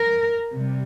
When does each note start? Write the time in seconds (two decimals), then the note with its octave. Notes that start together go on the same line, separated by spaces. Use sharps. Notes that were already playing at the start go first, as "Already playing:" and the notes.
Already playing: A#4
0.54 C3 G3